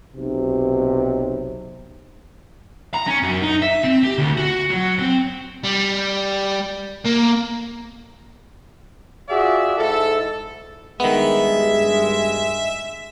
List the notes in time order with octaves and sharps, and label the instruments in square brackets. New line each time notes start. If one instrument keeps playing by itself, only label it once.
[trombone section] B1 C3
[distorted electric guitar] A#5
C#4
F#2
D#4
E5
C4
G4
D2
F#4
F#3
C4
G3
A#3
[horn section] F4 F#4 G#4 D5 E5
G#2 E4 A4
[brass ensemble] G2 G#3 [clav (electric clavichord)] D#3 B3 [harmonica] E5